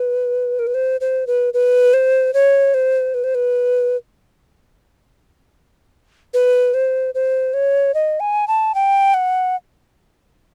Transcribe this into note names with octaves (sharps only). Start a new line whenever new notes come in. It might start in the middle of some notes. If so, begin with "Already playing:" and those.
Already playing: B4
A#4
B4
C5
C5
B4
B4
C5
C#5
C5
B4
C5
B4
B4
C5
C5
C#5
D#5
G#5
A5
G5
F#5